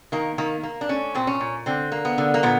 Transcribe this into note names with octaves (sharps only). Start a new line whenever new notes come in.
D#3 A#3
D#3 A#3
A#3
D4
A3 C#4
A#2 C4
C#4
A#2
D3 C4
A#3
B3
D3
A#3
A#2 B3